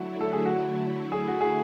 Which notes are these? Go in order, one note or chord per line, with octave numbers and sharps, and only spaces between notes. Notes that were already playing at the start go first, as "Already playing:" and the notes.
Already playing: D3 F#3 A3 E4 F#4
A4
G#4
F#4
D3 A3 E4 G#4
F#4
G#4